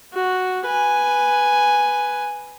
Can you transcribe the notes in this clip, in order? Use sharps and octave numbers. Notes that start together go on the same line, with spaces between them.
F#4
B4 G#5